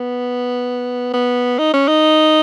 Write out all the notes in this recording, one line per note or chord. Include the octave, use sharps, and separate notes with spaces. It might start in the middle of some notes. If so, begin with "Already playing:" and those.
Already playing: B3
B3
D#4
C#4
D#4